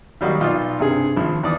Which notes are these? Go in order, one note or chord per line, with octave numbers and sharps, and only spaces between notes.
D#2 F#3 G3 F#4 D#5 F5
B1 F4 D5 D#5 F5
G2 C3 G#4
G#1 F3 B5
E2 D5 D#6